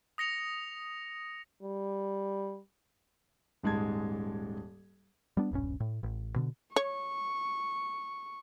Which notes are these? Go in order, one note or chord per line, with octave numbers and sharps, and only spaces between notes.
D#6 A#6 C#7 F7
G3
D#1 G#2 G#3 A5 G#6
G3 B3 D4
D#1 B1 G2 C#4
A2
A1
B2 D3
C#5 C#6